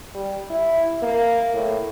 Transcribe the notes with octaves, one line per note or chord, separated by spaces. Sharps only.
G3
E4
A#3
A2